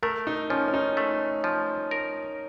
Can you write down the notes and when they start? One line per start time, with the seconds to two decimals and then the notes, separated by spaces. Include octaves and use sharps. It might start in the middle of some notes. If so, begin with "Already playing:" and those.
0.03 A3 A#4
0.27 D#4
0.50 F3 C#4
0.68 C#4
0.74 D#4
0.97 A3
1.44 F3
1.91 A#4